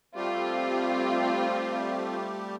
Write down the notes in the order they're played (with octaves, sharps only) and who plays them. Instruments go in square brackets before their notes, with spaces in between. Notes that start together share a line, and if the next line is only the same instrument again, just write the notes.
[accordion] G3 A3 G4 [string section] C4 F4